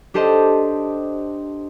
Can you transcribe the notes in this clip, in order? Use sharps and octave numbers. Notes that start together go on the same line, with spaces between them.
D4 G4 A4 C5 D#5